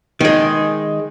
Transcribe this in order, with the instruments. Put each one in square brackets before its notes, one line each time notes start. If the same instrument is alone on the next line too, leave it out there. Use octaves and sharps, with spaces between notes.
[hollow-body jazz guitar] D#3 G#3